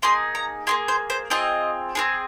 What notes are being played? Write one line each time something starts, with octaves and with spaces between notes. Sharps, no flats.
A#3 D#4 G#4 C6
A#5
A#3 D#4 G#4 C6
C5
C5
C4 F4 G#4 D#5
C4 F4 G#4